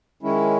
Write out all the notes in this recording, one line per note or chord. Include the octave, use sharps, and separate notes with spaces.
D#3 G#3 C#4 E4